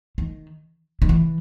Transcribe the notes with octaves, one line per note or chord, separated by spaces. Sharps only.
D#3
D#3
E3